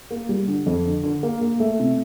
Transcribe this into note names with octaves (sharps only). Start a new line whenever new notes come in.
A#3
G3
D3
F2
D3
D3
A#3
A#3
A3
C3